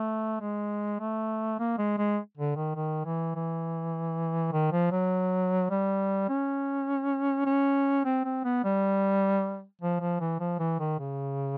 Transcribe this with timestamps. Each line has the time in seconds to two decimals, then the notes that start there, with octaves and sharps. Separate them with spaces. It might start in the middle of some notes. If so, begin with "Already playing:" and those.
Already playing: A3
0.41 G#3
1.00 A3
1.59 A#3
1.78 G#3
1.98 G#3
2.37 D3
2.56 D#3
2.76 D#3
3.05 E3
3.35 E3
4.53 D#3
4.72 F3
4.92 F#3
5.71 G3
6.29 C#4
7.46 C#4
8.05 C4
8.25 C4
8.45 B3
8.64 G3
9.81 F3
10.01 F3
10.20 E3
10.40 F3
10.59 E3
10.79 D#3
10.99 C#3